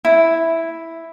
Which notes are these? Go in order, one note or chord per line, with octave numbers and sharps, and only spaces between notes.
E4